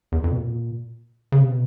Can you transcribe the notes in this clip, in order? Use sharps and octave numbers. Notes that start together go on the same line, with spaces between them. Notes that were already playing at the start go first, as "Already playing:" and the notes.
E2
F2
B2
A#2
C#3
C3
B2